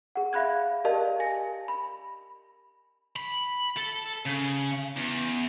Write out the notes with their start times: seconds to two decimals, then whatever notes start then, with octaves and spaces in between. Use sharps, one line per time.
0.16 G#4 F#5
0.33 E5 F5 B5 F#6 G#6
0.85 G4 A#4 D5 D#5 F5 A5
1.20 G#5 A#6
1.68 B5
3.16 B5
3.77 A4
4.26 C#3
4.96 E2